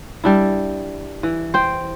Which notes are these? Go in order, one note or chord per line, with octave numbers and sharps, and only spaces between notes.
G3 D4 E4
E3
C5 G5